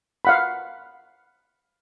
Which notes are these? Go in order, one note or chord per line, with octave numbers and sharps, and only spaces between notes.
F5 F#5 B5